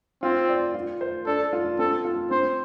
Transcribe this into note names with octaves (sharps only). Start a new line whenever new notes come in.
C4 F4
D5
F4
C5
D4 A4
F4
C4 A4
F4
C4 C5